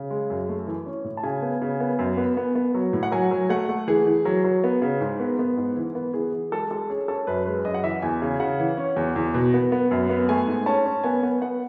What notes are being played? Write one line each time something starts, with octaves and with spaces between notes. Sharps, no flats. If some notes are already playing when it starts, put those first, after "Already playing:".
Already playing: C#3
G#3
F#2
A3
E3
C#4
A2
A5
C#3 G#5
B3
C#3
B3
F#2
B3
B3
B3
F#3
A2
F#5
F#3 G#5
F#3
A3 F#5
A3
E3 G#4
E3
F#3
F#3
B3
C#3
G#2
B3
B3
G#2
E3
B3
E3 G#4
E3
G#3 A4
G#3 A4
C#4 G#4
C#4 A4
F#2 B4
G#3 B4
F#2 D#5
F#5
E3 E5
E2 G#5
C#3
C#3 F#5
E3
C#4
E2
E2
B2
B3
B3
F#2
B3
A3 G#5
G#2
C#4 A5
C#4
B3 G#5
B3
B3 F#5